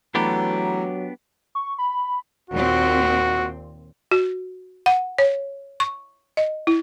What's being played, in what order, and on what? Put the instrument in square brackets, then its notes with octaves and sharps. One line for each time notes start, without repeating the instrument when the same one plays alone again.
[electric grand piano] E3 A3 B5 [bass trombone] F#3 [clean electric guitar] B3 D4 G4 [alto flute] A#5
[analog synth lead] C#6
B5
[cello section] D#2 A#2 C4 [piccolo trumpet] F#4
[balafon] F#4
F#5
C#5
C#6
D#5
E4